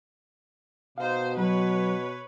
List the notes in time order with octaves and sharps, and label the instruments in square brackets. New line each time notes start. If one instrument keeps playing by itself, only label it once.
[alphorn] B2 [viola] D#4 C5 [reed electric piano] F5
[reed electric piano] F#3 [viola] B4 C#5